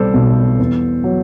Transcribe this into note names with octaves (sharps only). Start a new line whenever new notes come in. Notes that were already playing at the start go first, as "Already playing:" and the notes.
Already playing: B1 G3 A4 C5 D5
B1
E2
F#3